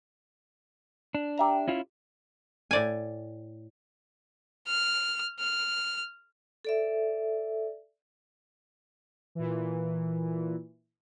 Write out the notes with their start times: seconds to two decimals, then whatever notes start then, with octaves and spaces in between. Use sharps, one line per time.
1.15 D4
1.38 G4 E5 A#5
1.68 C#4 E4 F4
2.71 A2 D5 G#5
4.67 F6
5.39 F6
6.65 A4 D5 E5
9.35 A#2 E3